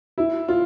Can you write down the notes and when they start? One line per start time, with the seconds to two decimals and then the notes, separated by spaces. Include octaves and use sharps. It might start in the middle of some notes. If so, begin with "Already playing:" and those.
0.18 E4
0.48 F4